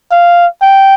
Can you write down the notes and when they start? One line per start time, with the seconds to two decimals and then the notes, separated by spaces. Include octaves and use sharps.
0.12 F5
0.62 G5